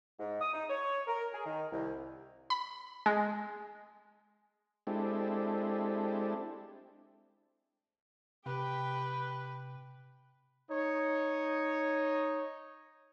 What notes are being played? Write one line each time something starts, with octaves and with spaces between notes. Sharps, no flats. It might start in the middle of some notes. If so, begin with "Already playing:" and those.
G#2
D#6
D#4
C#5
A#4
G#4
D#3
C2
B5
G#3
G#3 C4 D4 E4 G4 A4
C3 G4 B4 G5
D#4 C#5